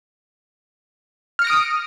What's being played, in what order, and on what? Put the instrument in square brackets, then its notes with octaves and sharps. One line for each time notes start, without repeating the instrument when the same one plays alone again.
[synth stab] F6
C#7
A#6
D7
D#6